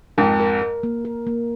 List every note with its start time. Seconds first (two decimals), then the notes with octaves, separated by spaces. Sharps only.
0.18 F2 G#2 A#4
0.40 A#4
0.62 A#4
0.83 A#3
1.05 A#4
1.27 A#3